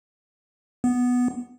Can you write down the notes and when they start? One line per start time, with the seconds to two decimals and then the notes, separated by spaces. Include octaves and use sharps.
0.84 B3